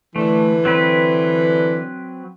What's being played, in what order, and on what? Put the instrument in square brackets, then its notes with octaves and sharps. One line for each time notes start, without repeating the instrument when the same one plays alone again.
[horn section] D3 E3 [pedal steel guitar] A3
[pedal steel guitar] F#3 C4 B4